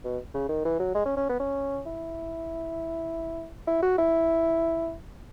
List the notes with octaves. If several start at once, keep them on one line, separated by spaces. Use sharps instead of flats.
B2
C#3
D#3
E3
F#3
G#3
C#4
C#4
B3
C#4
E4
E4
F#4
E4